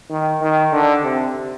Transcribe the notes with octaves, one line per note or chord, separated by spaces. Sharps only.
D#3
D#3
D3
C3